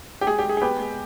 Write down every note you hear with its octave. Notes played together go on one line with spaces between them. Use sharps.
G4
G#3 G#4
G4
G#3 G#4
G#4
B3 G4 B4
G#3